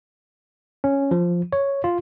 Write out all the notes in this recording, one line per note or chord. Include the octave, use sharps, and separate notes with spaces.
C#4
F3
C#5
F4